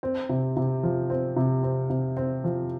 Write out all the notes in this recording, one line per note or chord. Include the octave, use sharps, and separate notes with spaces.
C4
C3
C3
F3
C4
C3
C4
C3
C4
F3